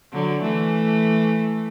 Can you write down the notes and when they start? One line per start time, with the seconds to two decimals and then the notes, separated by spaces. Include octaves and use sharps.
0.12 D3 F#3
0.42 E3 A3